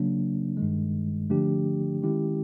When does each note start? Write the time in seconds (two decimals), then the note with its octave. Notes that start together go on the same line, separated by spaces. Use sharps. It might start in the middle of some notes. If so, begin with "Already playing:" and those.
Already playing: C#3 F#3 A#3 D4
0.57 G2 D#3 G#3
1.30 D3 F3 A3 D4 G4
2.03 D#3 G#3 C#4 E4 G4